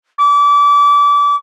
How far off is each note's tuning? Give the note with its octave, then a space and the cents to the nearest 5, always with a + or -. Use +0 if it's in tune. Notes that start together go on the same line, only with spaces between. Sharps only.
D6 -30